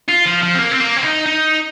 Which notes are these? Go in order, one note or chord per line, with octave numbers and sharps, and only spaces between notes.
F4
F3
F3
C4
A#3
C4
A#3
C4
D#4
D#4